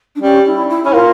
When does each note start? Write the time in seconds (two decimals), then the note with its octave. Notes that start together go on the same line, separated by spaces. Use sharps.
0.16 D4
0.22 G3 C#4
0.46 E4
0.70 E4
0.84 C#4 E4
0.93 A#3 F4